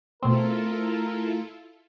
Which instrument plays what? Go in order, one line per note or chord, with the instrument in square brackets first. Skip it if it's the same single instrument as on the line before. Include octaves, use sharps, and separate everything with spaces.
[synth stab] B2 C4 [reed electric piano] A3 C6 [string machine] E4 F4 A4 [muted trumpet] A#4